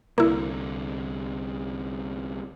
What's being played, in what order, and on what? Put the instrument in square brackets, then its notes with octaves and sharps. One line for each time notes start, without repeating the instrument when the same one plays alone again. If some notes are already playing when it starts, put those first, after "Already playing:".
[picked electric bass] C2 D3 [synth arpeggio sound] A#3 E4